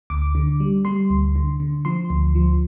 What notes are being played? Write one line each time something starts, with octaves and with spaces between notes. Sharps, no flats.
D2 D6
D3
G3
G3 C6
D2
D3
D3
F3 C6
D2
F3